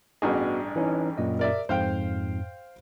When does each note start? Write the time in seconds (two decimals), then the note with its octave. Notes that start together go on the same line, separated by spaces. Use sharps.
0.22 A1 G2 B3 F#4 G#4 D#5
0.76 E3 C#4 D#4
1.18 F#2 A#2 D#5
1.39 A#4 D5 E5
1.69 F2 G#2 C5 F5 G5